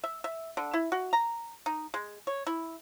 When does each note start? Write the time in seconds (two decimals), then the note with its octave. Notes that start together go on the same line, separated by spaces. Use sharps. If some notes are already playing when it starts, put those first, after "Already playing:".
0.04 E5
0.24 E5
0.57 D3
0.74 E4
0.92 F#4
1.13 A#5
1.66 D#4
1.94 G#3
2.27 C#5
2.47 E4